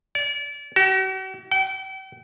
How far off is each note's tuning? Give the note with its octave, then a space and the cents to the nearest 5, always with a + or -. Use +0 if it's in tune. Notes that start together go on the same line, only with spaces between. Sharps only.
D5 -30
F#4 +45
G5 -40